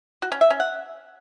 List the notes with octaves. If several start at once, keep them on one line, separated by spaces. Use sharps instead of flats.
F#4
C#4
E5
C#4
F#5